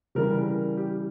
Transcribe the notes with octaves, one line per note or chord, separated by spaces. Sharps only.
C#3 E3 G3 A#4
G4